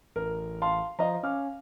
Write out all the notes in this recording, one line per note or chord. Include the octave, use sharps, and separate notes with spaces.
A1 A#4
F5 A5 C6
F3 D#5 F5 A#5
C#4 F5 D6 F6